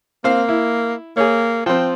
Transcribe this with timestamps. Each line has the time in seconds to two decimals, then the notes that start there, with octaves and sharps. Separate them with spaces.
0.24 A#3 C4 F5
0.49 E4
1.17 A#3 G#4 C#5
1.66 F3 C4 G5